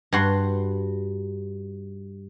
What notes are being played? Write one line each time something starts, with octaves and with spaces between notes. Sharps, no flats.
G2 F#4 C6